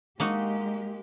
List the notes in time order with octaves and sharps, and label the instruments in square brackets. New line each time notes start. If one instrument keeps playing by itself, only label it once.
[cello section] G#3 G4 [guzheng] A#3 D#4 F#4